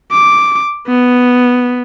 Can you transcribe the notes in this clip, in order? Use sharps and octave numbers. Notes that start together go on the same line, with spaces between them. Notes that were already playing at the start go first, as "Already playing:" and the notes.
D6
B3